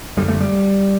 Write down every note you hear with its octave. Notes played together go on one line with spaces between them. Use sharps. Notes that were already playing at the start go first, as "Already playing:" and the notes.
F#2 D3 G3
A3
G3